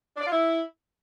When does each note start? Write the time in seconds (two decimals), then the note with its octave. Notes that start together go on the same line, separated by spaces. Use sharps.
0.16 D4
0.21 D5
0.26 F4
0.31 E4